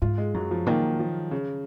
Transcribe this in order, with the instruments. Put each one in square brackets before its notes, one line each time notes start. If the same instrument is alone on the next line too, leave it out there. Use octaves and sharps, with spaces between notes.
[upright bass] G#2 [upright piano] F4
[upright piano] G#3
[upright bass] F#2 [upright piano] F#3
[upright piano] F3
[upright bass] A#2 [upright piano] D#3
[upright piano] F3
C#3